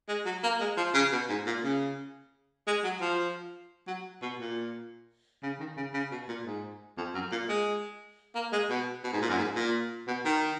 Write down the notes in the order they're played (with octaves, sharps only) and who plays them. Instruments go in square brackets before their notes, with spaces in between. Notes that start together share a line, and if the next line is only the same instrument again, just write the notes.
[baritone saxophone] G#3
F#3
A#3
G#3
F3
C#3
B2
G#2
A#2
C#3
G#3
F#3
F3
F#3
B2
A#2
C#3
D#3
C#3
C#3
B2
A#2
G#2
F2
F#2
A#2
G#3
A#3
G#3
B2
B2
G#2
A#2
F#2
G#2
A#2
B2
D#3